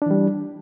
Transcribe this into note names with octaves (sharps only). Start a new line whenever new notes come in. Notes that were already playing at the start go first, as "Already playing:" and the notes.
E3 G3 D4